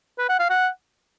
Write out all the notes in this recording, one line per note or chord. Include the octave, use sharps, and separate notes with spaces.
B4
F#5
F5
F#5